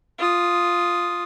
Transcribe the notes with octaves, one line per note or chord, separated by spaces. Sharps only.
F4 D#6